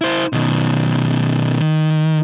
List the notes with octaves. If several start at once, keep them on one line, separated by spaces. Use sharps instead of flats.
E4 C5
B2 D#3
D#3